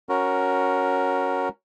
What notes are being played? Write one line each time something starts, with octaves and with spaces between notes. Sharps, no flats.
C#4 F#4 A#4